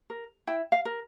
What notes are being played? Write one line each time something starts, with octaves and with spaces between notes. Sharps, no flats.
A#4
E4 G5
F5
A#4